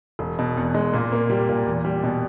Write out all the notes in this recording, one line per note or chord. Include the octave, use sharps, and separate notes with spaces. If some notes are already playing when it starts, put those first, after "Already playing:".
E1
B2
E2
G#3
A#2
A#3
G3
A#2
E2
G3
B2